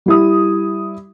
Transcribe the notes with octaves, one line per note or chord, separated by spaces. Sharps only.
G3 E4 D#6